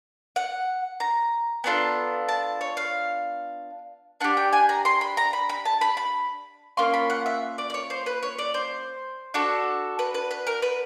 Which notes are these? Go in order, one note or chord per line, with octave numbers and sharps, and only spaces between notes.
F#5
A#5
B3 D4 F4 A4
A5
C#5
F5
D4 G4 F#5
G5
G#5
A#5
C6
B5
A#5
B5
B5
A5
B5
B5
A#3 C#4 F4 C6
B5
F#5
E5
D5
D5
C#5
C5
B4
C#5
D5
C5
D4 F#4 A4
B4
B4
B4
A#4
B4